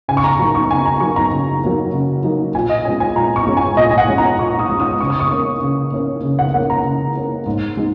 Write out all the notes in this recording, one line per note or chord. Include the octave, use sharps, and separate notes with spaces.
C#3 G#5
C#6
A#5
F#3 A#3 D#4 A#5
C#6
C#3 G#5
A#5
F#3 A#3 D#4 C#6
A#5
C#3
F#3 A#3 D#4
C#3
F#3 A#3 D#4
A#2 G#5
D#5
G#3 C#4 G#5
G#5
A#2 A#5
C#6
G#3 C#4
G#5
A#2 D#5
G#5
F#5
G#3 C#4
A#5
A#2 C#6
D#6
G#3 C#4
D#6
C#3 C#6
D#6
C#6
A#3 C#4
C#3
A#3 C#4
C#3
F#5
A#3 C#4 F#5
A#5
C#3
A#3 C#4
G#2
G#3 D#4